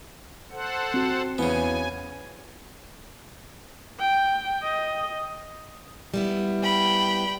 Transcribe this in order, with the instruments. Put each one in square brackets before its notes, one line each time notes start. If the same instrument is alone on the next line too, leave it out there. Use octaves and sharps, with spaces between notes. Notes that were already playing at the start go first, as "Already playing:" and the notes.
[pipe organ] A4 C5 F#5
[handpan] C4 F#4
[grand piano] E2 [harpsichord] C#3 B3 [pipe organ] G#5
[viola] G5
D#5
[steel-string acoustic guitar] G3 B3 E4
[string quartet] G5 B5